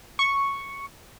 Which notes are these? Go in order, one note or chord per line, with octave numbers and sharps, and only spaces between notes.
C#6